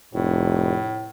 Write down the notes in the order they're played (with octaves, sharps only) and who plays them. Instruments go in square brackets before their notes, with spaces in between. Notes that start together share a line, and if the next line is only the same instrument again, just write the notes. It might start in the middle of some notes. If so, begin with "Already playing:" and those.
[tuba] F1 [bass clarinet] A2